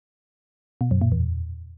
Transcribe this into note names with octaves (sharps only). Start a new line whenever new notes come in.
B2
F#2
A#2
E2